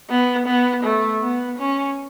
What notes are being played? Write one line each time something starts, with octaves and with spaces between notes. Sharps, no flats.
B3
B3
A3
B3
C#4